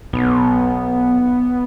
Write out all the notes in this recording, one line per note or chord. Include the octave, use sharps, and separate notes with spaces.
B1 B3